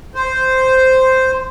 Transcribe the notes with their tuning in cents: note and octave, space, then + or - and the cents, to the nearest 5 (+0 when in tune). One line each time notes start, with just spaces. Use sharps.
C5 -5